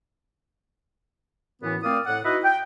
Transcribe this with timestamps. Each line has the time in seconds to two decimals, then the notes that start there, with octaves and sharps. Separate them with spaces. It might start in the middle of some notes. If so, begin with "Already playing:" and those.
1.62 F#2 A2 E3 B3
1.83 A#2 A3 C4 D5 F5 D#6
2.06 A2 F#5
2.24 D#4 E4 F#4 B4 D#5 E5
2.44 G5